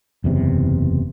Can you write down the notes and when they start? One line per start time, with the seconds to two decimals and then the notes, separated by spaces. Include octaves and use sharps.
0.24 F#1 E2 C3